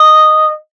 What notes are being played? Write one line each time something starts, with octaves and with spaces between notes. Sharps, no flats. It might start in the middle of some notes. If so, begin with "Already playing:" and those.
Already playing: D#5